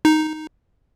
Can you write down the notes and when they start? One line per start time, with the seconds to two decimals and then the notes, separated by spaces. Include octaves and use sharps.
0.05 D#4